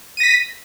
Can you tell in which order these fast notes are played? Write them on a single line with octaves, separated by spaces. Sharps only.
D#7 A#6 B6